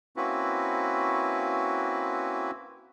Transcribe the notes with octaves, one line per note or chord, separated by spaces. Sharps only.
A#3 C4 C#4 E4 F#4 B4